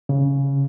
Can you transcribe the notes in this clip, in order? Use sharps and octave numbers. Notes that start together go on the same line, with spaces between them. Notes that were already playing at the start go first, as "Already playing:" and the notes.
C#3